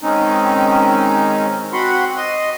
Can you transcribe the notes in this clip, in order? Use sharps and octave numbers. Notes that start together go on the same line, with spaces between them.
D#3 G#3 C4 C#4 D#4
C4 F#4 F#5 B5 C6
D#5 C6